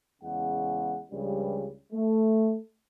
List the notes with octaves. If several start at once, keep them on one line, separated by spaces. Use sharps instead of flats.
E2 C#3 G#3 F#5
C#2 G2 C#3 F3 G3
A3